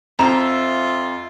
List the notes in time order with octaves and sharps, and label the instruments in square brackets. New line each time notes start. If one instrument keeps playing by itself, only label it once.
[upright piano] F2 [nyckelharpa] F4 [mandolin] C5 E5 [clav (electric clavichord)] A#5